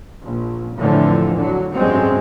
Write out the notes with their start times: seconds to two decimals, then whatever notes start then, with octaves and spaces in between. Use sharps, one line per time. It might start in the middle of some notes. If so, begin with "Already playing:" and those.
0.24 A#1
0.78 F2 A2 D3 E3 F3
1.38 D3 F#3
1.75 A1 D2 G2 F#3 G#3 C4